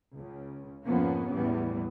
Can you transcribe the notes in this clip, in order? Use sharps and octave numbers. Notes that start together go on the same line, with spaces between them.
C#2 C#3
F2 G#2 F3 A#3 B3 C#4
E2 A2 E3 G3 B3